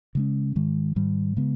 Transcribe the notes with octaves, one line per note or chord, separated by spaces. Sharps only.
C#3 G#3 C#4
G#2 D#3 G#3
G#2 D#3 G3
C#3 G#3 B3